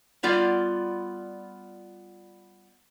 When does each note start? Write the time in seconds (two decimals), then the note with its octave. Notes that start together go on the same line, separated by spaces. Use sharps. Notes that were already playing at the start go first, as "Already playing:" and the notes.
0.23 G3 B3 F4 D5